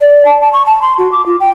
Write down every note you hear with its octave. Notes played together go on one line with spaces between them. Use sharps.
D5
A5
A5
C#6
A5
C6
F#4
D6
F4
G5